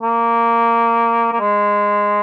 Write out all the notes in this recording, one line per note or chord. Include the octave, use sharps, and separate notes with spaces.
A#3
A#3
G#3